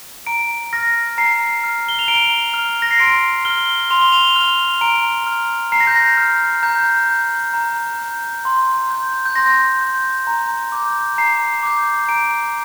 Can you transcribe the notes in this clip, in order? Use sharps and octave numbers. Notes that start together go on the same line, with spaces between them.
A#5 D7
F6 A#6
A#5 C7
F6
G7
F7
A#5 D7
F6
A#6
C7
C6 D7
F6 G7
C6 F7
G7
F7
F6
A#5 D7
F6
A#5 C7
A#6
G6
A#6
F6
A#5 G6
G6
A#5
G6
C6
G6
G6
C6 A#6
G6
A#5
D6 G6
A#5 C7
D6 G6
A#5 D7